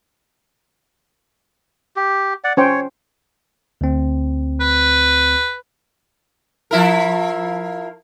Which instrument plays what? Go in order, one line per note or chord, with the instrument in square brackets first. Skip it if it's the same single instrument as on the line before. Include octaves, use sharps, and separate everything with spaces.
[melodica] G4
D5 F#5
[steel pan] C#4 C5 G5 [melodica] C#5
[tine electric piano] D2 C4
[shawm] B4
[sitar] F3 E4 A#4